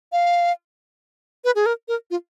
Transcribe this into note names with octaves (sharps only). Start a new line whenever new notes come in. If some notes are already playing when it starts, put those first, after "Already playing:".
F5
B4
G#4
A#4
A#4
F4